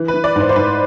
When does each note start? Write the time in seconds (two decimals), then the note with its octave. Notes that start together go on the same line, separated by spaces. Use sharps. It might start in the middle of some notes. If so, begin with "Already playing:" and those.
Already playing: E3
0.08 B4
0.14 E3
0.24 D5
0.36 G#2 C5
0.49 C5
0.56 G#2 B4